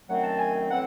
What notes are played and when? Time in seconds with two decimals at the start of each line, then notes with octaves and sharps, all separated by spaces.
0.08 F#2 D#3 F#3 A3 C4 F#5
0.24 A5
0.39 G#5
0.70 A2 E3 C4 F#5